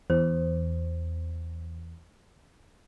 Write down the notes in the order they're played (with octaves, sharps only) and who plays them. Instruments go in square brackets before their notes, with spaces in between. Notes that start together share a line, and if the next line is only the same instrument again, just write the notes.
[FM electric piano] E2 [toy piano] C5